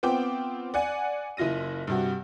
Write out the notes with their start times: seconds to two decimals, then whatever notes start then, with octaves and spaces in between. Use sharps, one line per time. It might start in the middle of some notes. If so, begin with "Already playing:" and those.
0.03 B3 C4 F4 G5 D6
0.74 D5 F#5 G#5
1.37 F#1 E4 F4 A#6 D#7
1.87 G2 C3 F#4